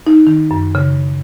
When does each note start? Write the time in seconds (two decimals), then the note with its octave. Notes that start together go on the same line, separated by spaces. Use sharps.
0.07 D#4
0.27 D#3
0.51 F#2
0.75 C#3